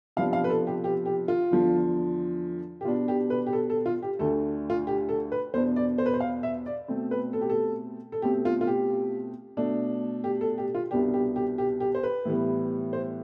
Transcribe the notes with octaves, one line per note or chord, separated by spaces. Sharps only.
C3 F3 B3 D4 F5
F5
B4
A4
G4
G4
G4
F4
E2 D3 F3
G4
B2 B3 D4 F4
G4
B4
G4
A4
A4
F4
G4
D2 D3 A3 A4
F4
G4
A4
B4
E2 B2 B3 D4 C5
D5
C5
B4
C5
F5
E5
D5
B2 A3 C4
B4
A4
G4
A4
A4
B2 A3 C4 G4
F4
F4
G4
B2 A3 D4
G4
A4
G4
F4
C2 B2 B3 D4 G4
G4
G4
G4
G4
C5
B4
A2 E3 G3 B3
C5